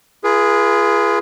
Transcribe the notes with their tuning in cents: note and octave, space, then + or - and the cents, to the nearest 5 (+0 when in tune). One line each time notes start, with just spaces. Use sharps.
F4 -35 G#4 +0 B4 -40